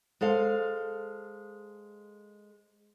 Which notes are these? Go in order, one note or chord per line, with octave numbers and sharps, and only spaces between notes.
G#3 A4 C5 F5